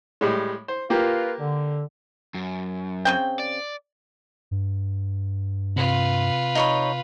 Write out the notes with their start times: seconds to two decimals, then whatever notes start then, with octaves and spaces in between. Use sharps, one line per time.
0.21 A2 G3 G#3
0.68 C5
0.90 A#3 F4 G4 A#4 B4
1.39 D3
2.34 F#2
3.05 C#3 C4 G5
3.39 D5
4.51 G2
5.76 C3 F4 B4
6.55 D#4 C#5 B5